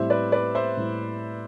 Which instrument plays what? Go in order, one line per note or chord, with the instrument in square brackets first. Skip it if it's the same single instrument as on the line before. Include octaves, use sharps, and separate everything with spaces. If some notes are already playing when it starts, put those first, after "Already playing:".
Already playing: [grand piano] A2 G3 C4 E4 [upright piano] C5 E5
[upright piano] B4 D5
B4 D5
C5 E5
[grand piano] A2 G3 C4 E4